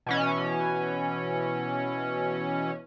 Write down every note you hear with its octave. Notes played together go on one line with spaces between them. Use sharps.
B2 E3 C#4